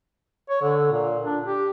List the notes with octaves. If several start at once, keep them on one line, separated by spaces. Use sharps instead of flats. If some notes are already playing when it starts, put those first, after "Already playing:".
C#5
D3
A#2
D4
G4